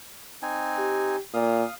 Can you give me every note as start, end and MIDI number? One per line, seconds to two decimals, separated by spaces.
0.42 1.17 60
0.42 1.17 63
0.42 1.17 80
0.78 1.19 67
1.34 1.64 46
1.34 1.74 77
1.34 1.74 87